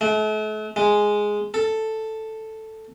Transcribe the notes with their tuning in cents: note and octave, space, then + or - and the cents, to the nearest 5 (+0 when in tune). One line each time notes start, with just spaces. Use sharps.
A3 -40
G#3 +0
A4 +0